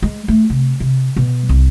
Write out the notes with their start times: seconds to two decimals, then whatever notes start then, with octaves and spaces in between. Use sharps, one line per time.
0.02 G#3
0.28 A3
0.50 C3
0.80 C3
1.16 B2
1.49 C2